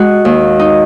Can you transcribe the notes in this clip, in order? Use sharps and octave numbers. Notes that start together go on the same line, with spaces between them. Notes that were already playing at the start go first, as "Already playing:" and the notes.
Already playing: G#3 F#4
D#2
D#4